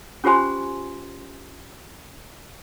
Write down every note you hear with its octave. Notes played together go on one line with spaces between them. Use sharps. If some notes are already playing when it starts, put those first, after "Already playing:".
C#4 F4 G4 C5 G#5 C6